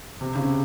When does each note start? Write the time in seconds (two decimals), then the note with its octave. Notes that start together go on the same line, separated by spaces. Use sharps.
0.21 C3
0.35 C#3